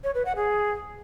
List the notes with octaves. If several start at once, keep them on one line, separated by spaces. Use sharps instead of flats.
C#5
B4
F#5
G#4